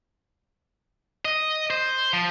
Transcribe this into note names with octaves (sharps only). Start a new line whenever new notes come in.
D#5
C5
F3